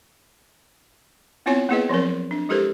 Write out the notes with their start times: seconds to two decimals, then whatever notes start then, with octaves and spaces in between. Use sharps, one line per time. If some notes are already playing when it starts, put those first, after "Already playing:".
1.46 B3 C4 E4 F4 C#5 G#5
1.69 A#3 B3 E4 G#4 B4 D#5
1.89 F3 F#3 C4 A#4
2.31 D4
2.49 G#3 E4 G4 A4 A#4 C5